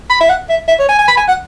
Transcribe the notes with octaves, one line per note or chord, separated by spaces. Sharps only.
B5
E5
F#5
E5
E5
C#5
G#5
G#5
B5
G#5
F#5